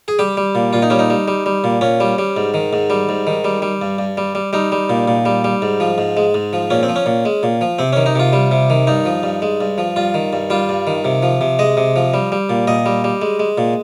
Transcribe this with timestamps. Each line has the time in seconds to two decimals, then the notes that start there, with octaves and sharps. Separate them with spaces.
0.08 G#4
0.19 G3 G4
0.37 G3
0.55 A#2
0.73 A#2 F4
0.82 D#4
0.90 G3 C#4
0.99 D#4
1.10 G3
1.28 G3
1.46 G3
1.64 A#2
1.81 A#2 C#4
2.00 G3
2.18 G3
2.37 G#2
2.54 D#3
2.73 G#2
2.90 G3
3.09 G#2
3.27 D#3
3.44 G3
3.62 G3
3.82 G2
3.99 G2
4.18 G3
4.35 G3
4.53 G3 D#4
4.72 G3
4.90 A#2
5.08 A#2
5.26 G3
5.44 G3
5.62 G#2
5.80 F3
5.98 G#2
6.17 G#3
6.34 G#2
6.53 F3
6.70 A#2 C#4
6.83 C4
6.89 F3
6.96 C#4
7.06 A#2
7.25 G#3
7.43 A#2
7.61 F3
7.79 C3 C4
7.93 D#3 C#4
8.06 D#4
8.15 C3 F4
8.33 G3
8.51 C3
8.70 D#3
8.87 G2 D#4
9.05 F3
9.23 G2
9.42 G#3
9.61 G2
9.78 F3
9.96 G2 F4
10.14 D#3
10.33 G2
10.50 G3 F4
10.69 G2
10.87 D#3
11.05 C3
11.23 F3
11.41 C3
11.59 G#3 D#5
11.77 C3
11.96 F3
12.14 G3
12.32 G3
12.50 A#2
12.67 A#2 D#5
12.86 G3
13.04 G3
13.22 G#3
13.40 G#3
13.58 A#2